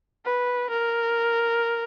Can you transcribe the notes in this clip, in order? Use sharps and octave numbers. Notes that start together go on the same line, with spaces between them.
B4
A#4